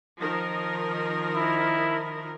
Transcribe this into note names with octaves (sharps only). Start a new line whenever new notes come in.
D#3 F3 A#4
E4